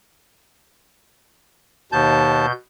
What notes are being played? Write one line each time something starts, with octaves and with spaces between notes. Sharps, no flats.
D#2 B2 A5 G6